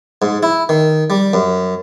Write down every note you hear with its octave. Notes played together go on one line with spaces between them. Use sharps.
G#2
E4
D#3
G3
F#2